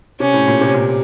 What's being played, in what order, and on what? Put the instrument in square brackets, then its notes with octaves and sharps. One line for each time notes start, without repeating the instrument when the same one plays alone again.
[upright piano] C3 [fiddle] C#4
[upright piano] A2
A#2
C3
A#2